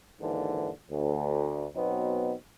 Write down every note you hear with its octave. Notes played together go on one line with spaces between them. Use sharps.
D#2 G#2 D3 E3
D2
B2 F#3 B3 C4 D#4